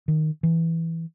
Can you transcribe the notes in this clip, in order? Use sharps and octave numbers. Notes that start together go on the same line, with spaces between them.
D#3
E3